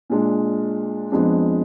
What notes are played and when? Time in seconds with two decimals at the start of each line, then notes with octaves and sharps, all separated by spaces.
0.10 A#2 G#3 D4
1.12 F2 F3 G#3 B3 D4